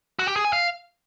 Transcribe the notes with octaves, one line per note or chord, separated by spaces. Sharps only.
F#4
G4
G#4
G#5
F5